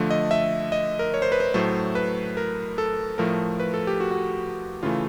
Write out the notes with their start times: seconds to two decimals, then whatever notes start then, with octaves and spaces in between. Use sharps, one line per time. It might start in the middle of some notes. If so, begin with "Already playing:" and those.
Already playing: D3 F3 A3
0.11 D#5
0.31 E5
0.72 D#5
0.99 A#4
1.14 C#5
1.22 C5
1.32 B4
1.40 C5
1.54 A2 F#3 A3 C5
1.95 B4
2.37 A#4
2.78 A4
3.18 A2 F3 A3 A#4
3.60 B4
3.74 A4
3.87 G4
4.00 F#4
4.11 F#4
4.83 C#3 E3 A3 F4